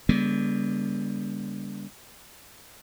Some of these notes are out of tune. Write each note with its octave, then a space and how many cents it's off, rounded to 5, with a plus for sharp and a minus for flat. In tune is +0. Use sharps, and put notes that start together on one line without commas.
D3 -35 G3 +40 B3 -35